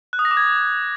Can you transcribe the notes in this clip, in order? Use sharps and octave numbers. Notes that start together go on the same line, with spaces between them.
F#6
D#6
A#6
D6
G#6